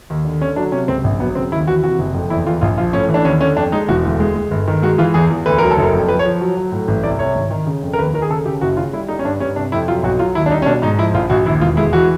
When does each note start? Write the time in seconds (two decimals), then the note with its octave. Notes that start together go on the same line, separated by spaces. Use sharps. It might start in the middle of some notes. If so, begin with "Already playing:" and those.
0.10 D#2
0.25 D3
0.41 D3 C#4
0.56 F#3 D4
0.72 C3 C#4
0.88 C#2 C4
1.04 A#1
1.20 F#3 B3
1.35 C#3 C4
1.52 D#2 E4
1.67 E3 F#4
1.83 C3 F#4
1.99 F#1
2.14 F2
2.30 E2 E4
2.46 E2 F4
2.61 A#1 F4
2.78 F3 F4
2.93 A2 C#4
3.09 E3
3.14 D4
3.25 D#2 C#4
3.41 D3 C#4
3.56 F2 D4
3.72 G#3 D#4
3.88 E1 F#4
4.03 D2
4.20 G#3
4.36 G#3
4.51 G1
4.67 D#3
4.82 G#3 F#4
4.98 E3 F4
5.14 E2 G#4
5.30 E2
5.46 D2 B4
5.58 F#3 A#4
5.71 A4
5.77 F#1
5.83 A#4
5.93 F2
6.09 F3 B4
6.19 C#5
6.25 F3
6.41 F#3
6.57 F#3
6.72 A2
6.88 A1
7.04 C2 D5
7.19 C2 C#5
7.35 G#1
7.51 D#3
7.67 C#3
7.83 F2
7.93 A#4
7.98 D#2 B4
8.14 D#3 A#4
8.22 G#4
8.30 C#3 A4
8.46 C#3 G4
8.61 F#1 F#4
8.77 C#3 F4
8.93 G3 E4
9.08 G3 D#4
9.19 C#4
9.24 G2 D4
9.40 G2 C#4
9.56 C3 D4
9.72 F2 E4
9.88 F#3 F4
10.03 B1 F#4
10.19 F#3 F4
10.35 D#2 E4
10.46 D4
10.50 G3 D#4
10.62 C#4
10.66 B2 D4
10.82 G#2 D#4
10.98 F3 E4
11.14 A#1 F4
11.30 A#1 F#4
11.46 D#2 E4
11.61 E1 F4
11.77 G#3 E4
11.93 E3 F#4